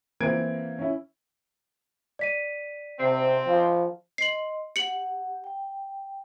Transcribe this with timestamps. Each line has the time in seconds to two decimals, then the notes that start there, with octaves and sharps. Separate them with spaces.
0.20 E3 A#3 C4 G#6 D7
0.79 C#4 E4
2.19 D5 B6 D#7
3.00 C3 C4
3.47 F3
4.18 D#5 C6 C7 F#7
4.76 G4 F#5 C#7 F#7
5.44 G5